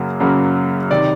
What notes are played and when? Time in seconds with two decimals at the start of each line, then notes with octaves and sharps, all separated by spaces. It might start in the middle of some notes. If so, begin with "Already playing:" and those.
Already playing: F#2 C#3 F#3 A#3
0.20 F#2 C#3 F#3 A#3
0.91 C3 D#3 D5